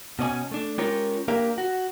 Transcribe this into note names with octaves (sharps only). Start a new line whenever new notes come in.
B2 C#4 D5 G#5
A3 D4
G#3 C#4 F4 G4 A#4 C#5
A#3 D4 G4 A#4 F5
F#4